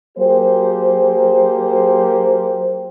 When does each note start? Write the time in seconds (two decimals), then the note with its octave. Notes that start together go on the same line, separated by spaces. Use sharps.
0.18 F#3 A#3 G4 G#4 C5